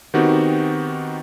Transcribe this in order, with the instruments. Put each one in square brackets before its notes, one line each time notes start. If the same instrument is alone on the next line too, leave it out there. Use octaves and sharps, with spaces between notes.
[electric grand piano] D#3 B3 C4 D#4 F#4 G4